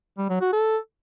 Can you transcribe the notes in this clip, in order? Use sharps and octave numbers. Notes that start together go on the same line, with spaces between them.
G3
F#3
F#4
A4